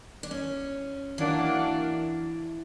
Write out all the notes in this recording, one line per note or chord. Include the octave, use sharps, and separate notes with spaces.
D4
C#4
E3 F#3 A#3 D4